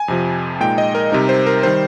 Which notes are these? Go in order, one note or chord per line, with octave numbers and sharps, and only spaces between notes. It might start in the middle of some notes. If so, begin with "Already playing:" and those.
Already playing: G#5
F2 C3 F3
A#2 G#3 D#4 G5
D#5
A#4
C3 G3 C4 D#4 A#4
C5
A#4
D#3 G3 C5